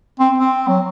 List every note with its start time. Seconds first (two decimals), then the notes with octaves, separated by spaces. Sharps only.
0.19 C4
0.38 C4
0.68 F#3